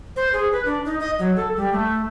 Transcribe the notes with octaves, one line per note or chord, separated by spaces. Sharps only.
C5
G#4
B4
D4
D#4
D#5
F#3
A4
G3
A3